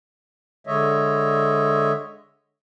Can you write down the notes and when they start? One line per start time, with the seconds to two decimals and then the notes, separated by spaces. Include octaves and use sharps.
0.67 D3 G#3 C#5 D#5 E5